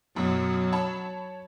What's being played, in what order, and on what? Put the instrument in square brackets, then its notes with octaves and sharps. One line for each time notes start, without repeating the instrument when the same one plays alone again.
[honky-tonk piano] F#2 B2 [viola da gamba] F#3
[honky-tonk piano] C#5 A5 B5